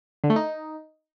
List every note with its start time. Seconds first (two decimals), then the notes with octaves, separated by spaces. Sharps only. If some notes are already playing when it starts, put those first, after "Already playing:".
0.24 D3
0.30 A3
0.36 D#4